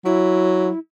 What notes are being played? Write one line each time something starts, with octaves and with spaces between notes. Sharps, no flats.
F#3 E4